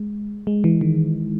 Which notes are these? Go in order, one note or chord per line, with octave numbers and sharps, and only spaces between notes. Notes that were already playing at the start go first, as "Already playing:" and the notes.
Already playing: G#3
G#3
E3
D#3